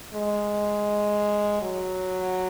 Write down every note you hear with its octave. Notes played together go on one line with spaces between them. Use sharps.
G#3
F#3